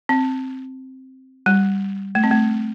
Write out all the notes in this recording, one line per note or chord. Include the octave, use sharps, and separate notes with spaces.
C4
G3
A3
C4
A3